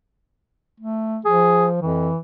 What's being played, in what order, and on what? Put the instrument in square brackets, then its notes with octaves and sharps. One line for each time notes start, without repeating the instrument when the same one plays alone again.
[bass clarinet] A3
[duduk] F3 [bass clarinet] G#4
[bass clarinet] F2 [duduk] E3